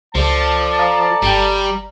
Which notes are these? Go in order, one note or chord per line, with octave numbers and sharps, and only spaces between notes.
C#2 F3 A4 D5 A5
F5 A#5 D#6
G1 G3 G5